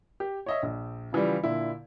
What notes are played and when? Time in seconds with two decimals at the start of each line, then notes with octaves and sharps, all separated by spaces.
0.20 G4
0.46 C#5 D#5 E5
0.63 A#1
1.13 C#3 E3 F3 G3
1.43 A#2 D3 E4